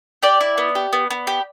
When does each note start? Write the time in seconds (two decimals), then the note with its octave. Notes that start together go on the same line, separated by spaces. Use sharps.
0.23 G4 D5
0.41 E4
0.58 B3
0.75 G4
0.93 B3
1.10 B3
1.27 G4